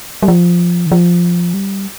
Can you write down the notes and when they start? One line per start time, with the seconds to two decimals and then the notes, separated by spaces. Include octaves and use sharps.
0.23 G3
0.28 F3
0.86 D#3
0.92 F3
1.54 G3